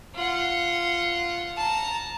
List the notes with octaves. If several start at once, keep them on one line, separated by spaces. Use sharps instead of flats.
F4 F#5
A5 A#5